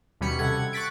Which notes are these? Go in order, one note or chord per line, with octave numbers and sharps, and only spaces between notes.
D#2 B2 G3 C#4 B5 C#7
C3 A4 F#5 G#6
C#6 F#6 A6 B6 D7